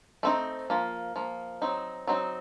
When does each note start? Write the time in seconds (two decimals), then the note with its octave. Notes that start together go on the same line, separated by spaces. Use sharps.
0.23 A3 C4 D#4
0.70 F3 A#3
1.16 F3 A#3
1.62 F#3 C4 D#4
2.07 F#3 C4 D#4